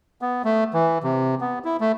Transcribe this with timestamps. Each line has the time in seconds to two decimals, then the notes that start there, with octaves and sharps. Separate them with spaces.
0.22 B3
0.45 A3
0.73 E3
1.03 C3
1.41 B3
1.65 E4
1.80 A3